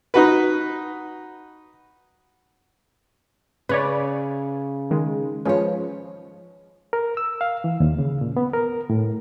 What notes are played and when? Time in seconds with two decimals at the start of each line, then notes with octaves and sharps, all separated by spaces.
0.14 D#4 F#4 B4
3.69 C#3 B4 C#5 D5
4.91 D#3 G#3
5.45 F3 G#3 C#4 B4 C#5
6.93 A#4
7.17 E6
7.41 F5
7.64 E3
7.80 D#2
7.98 C#3
8.21 A#2
8.37 B3
8.53 A#4
8.90 A2